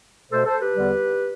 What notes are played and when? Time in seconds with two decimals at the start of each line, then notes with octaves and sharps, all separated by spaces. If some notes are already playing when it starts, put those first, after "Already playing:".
0.31 B2 A3 A4 C5
0.46 A4 C5
0.61 G4 B4
0.77 E2 D3 G3